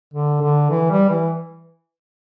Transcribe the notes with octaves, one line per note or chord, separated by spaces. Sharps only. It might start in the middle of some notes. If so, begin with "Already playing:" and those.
D3
D3
E3
G3
E3